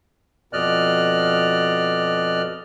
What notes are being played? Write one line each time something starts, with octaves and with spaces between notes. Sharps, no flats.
F2 B2 D5 D#5 F6 F#6